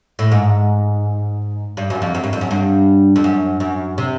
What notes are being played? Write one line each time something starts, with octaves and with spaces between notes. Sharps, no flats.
A2
G#2
G2
F#2
F2
F#2
G2
F2
F#2
G2
F2
F#2
F#2
C3